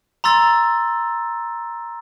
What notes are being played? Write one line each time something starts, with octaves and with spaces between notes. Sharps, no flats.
A#5 C6 E6 A6